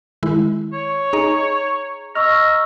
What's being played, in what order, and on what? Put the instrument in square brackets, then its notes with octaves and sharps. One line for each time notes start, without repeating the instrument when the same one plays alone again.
[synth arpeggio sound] D#3 G#3 E4
[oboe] C#5
[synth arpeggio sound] D#4 D#5 [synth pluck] G#4 [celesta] A#5
[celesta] D#5 C#6 E6 [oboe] A#5 [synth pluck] F6